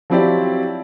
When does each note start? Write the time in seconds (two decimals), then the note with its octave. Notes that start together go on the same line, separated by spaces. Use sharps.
0.10 F3 F#3 C4 E4 G4 D5